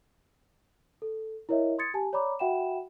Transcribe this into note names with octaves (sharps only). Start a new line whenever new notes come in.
A4
E4 A#4 C#5 D#5 E5
C6 D#6 G#6 A6 C#7
G4 G#5 A5
C#5 D5 A#5 B5 D6
F#4 E5 F#5 G5 B5 E7